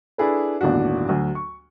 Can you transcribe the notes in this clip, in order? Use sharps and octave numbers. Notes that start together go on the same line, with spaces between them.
D4 E4 G#4 A4 B4
G1 D#2 A2 D4 F#4
D2 F#3
C#6